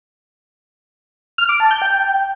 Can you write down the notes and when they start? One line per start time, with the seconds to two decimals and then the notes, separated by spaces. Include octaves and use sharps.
1.38 F6
1.49 D6
1.60 A5
1.71 G6
1.82 G5